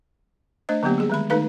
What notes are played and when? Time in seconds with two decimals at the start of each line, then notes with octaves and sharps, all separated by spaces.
0.69 A3 D4 C5 D#5
0.83 D3 F#3 A#3 B3 G4
0.98 G3 G#4
1.10 D#3 G#3 B5
1.30 D#3 A3 D#4 A4 B4 F5